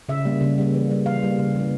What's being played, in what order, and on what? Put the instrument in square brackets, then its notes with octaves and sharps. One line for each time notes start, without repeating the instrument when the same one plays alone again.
[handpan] C#3 E5
G3 A#3
C#3
G3 A#3
E3
G3 A#3
E3 F5
G3 A#3
C#3
E3 A#3